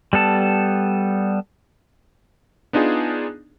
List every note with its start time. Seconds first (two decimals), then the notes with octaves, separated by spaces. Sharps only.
0.13 G3 B3 A4 A5
2.73 B3 D4 D#4 F4 G#4